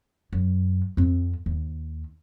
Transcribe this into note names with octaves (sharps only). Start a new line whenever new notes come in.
F#2
F2 C4
D#2